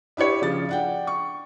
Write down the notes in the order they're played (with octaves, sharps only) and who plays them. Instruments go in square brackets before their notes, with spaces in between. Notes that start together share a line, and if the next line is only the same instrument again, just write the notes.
[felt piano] D4 E4 G4 C#5
C#3 F3 A6
D4 F#5 G5
C#6